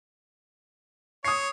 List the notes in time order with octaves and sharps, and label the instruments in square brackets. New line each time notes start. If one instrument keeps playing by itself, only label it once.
[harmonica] C#5 [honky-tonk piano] D#6 C7